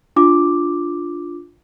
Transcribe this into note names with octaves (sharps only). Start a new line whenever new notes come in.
D4 F4 D6